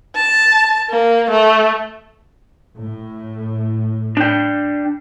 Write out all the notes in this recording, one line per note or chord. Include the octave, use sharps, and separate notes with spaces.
A5
A#3
A3
A2
D4 G5